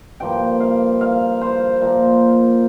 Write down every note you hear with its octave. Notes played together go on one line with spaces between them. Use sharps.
G2 F3 A#3 G5
F5
F5
C5
A#2 F3 A#3